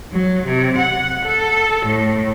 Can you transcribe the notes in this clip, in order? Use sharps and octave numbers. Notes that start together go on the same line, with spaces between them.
F#3
C3
F#5
A4
A2